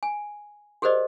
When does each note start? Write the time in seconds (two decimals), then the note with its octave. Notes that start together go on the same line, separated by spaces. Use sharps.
0.03 G#5
0.82 G4 G#4 A#4 C5 D5 D#5